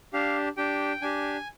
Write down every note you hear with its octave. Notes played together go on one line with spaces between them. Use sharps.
D4 G4 F5
D4 G4 G5
D4 G4 G#5